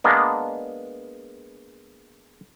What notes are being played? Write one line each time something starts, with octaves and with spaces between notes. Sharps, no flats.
G#3 A#3 B3 D4